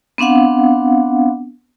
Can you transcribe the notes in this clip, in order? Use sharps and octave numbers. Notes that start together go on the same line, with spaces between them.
B3 C4 D4 F5 F#5